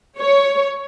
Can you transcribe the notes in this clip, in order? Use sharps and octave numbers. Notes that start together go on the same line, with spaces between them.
C#5